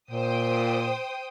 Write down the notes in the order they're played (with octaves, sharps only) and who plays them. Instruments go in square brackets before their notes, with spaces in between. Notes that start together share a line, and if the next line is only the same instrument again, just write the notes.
[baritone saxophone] A#2 [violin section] C5 G5 D#6